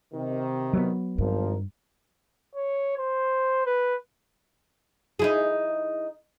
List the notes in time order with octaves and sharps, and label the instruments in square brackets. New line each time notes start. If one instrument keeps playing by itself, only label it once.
[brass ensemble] C3 D#3
[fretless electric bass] F#3 B3
[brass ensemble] G#1 F3 A#4 [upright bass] G2
[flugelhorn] C#5
C5
B4
[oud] D#4 E4 G#4